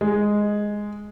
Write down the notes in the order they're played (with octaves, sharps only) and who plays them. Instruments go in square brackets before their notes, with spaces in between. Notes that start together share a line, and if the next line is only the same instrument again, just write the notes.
[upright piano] G#3